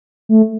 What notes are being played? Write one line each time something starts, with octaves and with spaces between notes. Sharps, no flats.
A3